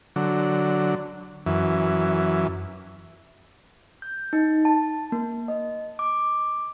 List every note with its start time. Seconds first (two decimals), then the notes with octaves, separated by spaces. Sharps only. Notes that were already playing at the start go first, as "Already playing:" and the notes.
0.16 D3 F#3
1.46 F#2 E3
4.02 G6
4.33 D#4
4.65 A5
5.12 A#3
5.48 D#5
5.99 D6